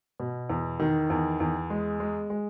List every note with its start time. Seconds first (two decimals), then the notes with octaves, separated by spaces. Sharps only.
0.20 B2
0.50 E2
0.80 D#3
1.10 E2
1.40 E2
1.70 G#3
2.00 G#3
2.30 G#3